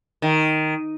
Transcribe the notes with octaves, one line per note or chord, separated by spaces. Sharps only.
D#3